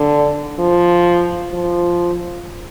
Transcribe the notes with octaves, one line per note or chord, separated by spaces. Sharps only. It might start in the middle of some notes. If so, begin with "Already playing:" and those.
Already playing: D3
F3
F3